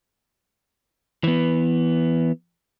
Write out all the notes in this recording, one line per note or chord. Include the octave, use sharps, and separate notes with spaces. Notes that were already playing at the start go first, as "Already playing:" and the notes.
E3 B3